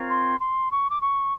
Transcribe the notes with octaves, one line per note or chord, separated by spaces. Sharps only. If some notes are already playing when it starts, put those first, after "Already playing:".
Already playing: C4 F4 A#4 C#5
C6
C6
C#6
D6
C#6